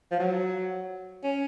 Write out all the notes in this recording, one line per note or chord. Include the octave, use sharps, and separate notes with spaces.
F3
F#3
C#4